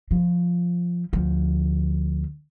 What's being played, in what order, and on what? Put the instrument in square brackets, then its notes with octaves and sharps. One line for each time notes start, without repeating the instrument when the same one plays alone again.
[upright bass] F3
D2 F3